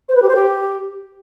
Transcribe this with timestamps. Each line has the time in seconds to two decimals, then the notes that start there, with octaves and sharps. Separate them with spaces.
0.09 C5
0.15 B4
0.22 G4
0.28 C5
0.35 G4